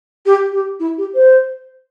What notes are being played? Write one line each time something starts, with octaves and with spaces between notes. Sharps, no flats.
G4
G4
E4
G4
C5